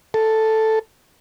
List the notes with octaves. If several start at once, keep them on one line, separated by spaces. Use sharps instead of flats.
A4